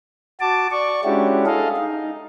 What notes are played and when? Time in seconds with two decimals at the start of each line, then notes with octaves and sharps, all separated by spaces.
0.40 F#4 A5 D6
0.71 D5 C#6
1.04 G#3 C#4 D4 E4 F#4 G4
1.46 G#4 A4 D#5 F5
1.77 D#4